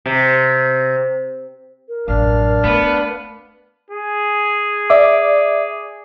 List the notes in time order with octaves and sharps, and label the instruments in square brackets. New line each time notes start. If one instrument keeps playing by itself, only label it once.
[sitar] C3
[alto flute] A#4
[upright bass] A1 F#2 [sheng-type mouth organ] D4 F5 F6
[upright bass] A3 [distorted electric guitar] B3 B4
[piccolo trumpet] G#4
[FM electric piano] D5 E5 D6